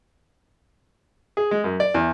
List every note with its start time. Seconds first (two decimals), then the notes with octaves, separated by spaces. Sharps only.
1.37 G#4
1.51 G#3
1.64 F#2
1.80 D5
1.94 E2